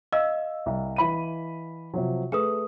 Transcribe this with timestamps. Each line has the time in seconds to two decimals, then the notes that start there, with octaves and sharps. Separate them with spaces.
0.12 D#5 F5 E6
0.66 C2
0.96 E3 B5 D#7
1.94 C3 F3 F#3
2.32 A3 G#4 B4 D#6